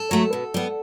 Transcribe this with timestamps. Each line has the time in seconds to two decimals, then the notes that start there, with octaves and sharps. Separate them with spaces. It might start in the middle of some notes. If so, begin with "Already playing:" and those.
Already playing: A4
0.11 F#3 A3
0.33 B2
0.54 G3 B3